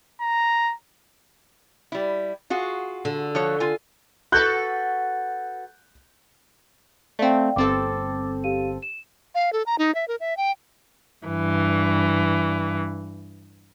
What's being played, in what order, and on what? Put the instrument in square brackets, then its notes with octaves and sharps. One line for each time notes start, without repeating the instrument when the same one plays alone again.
[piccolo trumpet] A#5
[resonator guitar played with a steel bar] G3 E4
F4 F#4 G#4
[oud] D3
[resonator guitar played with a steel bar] F3 F#4 C#5
F4 G#5
[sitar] F#4 A4 B4 [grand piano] F#6 G6
[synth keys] A3 C4 [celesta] D5 F5 G5
[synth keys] G1 C4 A4 [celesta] D6 A6
[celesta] G4 F5 D#7
E7
[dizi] F5
A4
A#5
D#4
E5
A#4
E5
G5
[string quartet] G2 E3